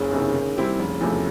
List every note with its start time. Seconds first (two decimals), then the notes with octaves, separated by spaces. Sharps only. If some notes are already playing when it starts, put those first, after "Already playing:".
Already playing: F#1 C#3
0.12 E2 C3 D#3
0.35 D#3
0.57 G3 C4 E4 G4
0.78 F1 C#3
1.01 E2 C3 F3 A3